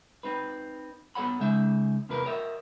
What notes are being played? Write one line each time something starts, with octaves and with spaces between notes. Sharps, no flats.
C4 D#4 B4
B3 A4 C#5 F#5 B5
C#3 G#3 C#4 D#4 E5
E2 C3 A#3 E4 A#4 B4
A#4 C#5 D#5 E5